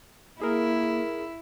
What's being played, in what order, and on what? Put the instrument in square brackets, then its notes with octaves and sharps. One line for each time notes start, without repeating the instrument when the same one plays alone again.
[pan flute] A#3 [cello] E4 [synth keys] G#4 A#4